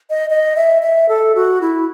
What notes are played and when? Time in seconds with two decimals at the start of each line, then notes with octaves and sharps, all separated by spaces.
0.10 D#5
0.30 D#5
0.56 E5
0.82 E5
1.09 A4
1.35 F#4
1.61 E4